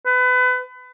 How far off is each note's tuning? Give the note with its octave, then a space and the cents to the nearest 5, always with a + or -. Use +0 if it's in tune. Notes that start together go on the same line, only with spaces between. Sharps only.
B4 +30